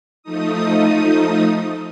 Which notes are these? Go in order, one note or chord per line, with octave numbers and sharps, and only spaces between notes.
F3 A3 D#4 D#6